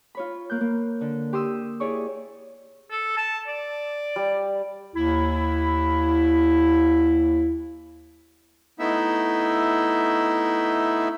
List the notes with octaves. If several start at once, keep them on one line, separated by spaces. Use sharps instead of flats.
F4 C#5 B5
A#3 F#6 G6
A#3
D3
G4 C6 D#6 E6
E4 G#4 C#5 D5 C#6
A4
A5
D5
G3
D#2 E4
A3 B3 D#4 E4 E5